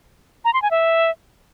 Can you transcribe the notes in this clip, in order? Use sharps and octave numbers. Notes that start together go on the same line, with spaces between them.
A#5
C6
G#5
E5